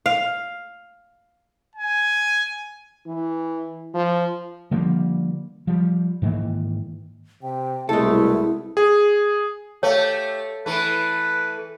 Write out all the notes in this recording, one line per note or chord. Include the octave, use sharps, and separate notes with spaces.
F5
G#5
E3
F3
D3 F3 G3 A#3
F3 G3
G#2 D#3 E3 A#3
C3 G5
C2 B2 G#3 A3 E4 A4
G#4
A3 G4 C#5 F5
E3 A3 B4